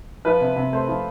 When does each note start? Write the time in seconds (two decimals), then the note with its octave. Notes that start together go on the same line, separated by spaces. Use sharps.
0.25 F3 B4
0.41 C3
0.56 C3
0.72 A3 C5
0.88 F3